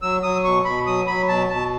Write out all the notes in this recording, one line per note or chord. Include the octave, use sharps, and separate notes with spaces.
F#3 E6
F#3 D#6
B2 C#6
B2 B5
F#3 D#6
F#3 B5
B2 A5
B2 A5